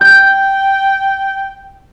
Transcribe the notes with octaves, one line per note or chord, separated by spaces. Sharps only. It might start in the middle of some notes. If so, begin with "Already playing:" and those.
G5 G6